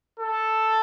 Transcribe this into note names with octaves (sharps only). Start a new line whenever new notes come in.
A4